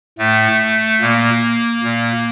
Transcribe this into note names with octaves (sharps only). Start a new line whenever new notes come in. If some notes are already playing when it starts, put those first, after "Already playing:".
A2 A3
A#2 A#3
A#2